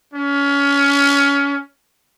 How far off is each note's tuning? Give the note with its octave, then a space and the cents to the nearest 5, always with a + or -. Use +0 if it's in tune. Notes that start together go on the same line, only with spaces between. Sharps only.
C#4 +25